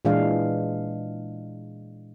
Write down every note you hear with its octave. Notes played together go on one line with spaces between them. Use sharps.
A#2 E3 G#3 D4 F5